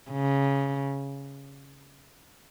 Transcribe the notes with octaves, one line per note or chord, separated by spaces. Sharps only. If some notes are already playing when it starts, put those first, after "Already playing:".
C#3